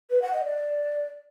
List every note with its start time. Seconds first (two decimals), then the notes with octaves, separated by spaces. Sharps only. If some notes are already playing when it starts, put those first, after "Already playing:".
0.10 B4
0.22 F#5
0.33 D#5
0.45 D5